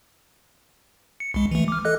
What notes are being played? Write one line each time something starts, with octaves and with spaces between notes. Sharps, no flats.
C#7
C2 G#3
E3 A3
D6 F6
A4 D#5 F#6